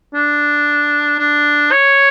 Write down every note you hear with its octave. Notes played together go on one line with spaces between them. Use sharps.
D4
D4
C#5